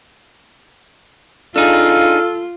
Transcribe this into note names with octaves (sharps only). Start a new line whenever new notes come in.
D4 D#4 F4 G#4 A4 F5